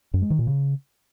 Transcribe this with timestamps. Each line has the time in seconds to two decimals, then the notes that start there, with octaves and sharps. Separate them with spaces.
0.14 F#2
0.22 G#3
0.30 D#3
0.39 A#2
0.47 C#3